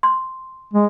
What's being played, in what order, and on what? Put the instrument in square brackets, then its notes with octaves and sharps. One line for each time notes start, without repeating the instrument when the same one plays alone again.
[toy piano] C6
[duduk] G#3